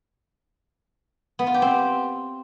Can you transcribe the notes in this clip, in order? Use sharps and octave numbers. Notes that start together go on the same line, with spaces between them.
B3
F4
G4
C4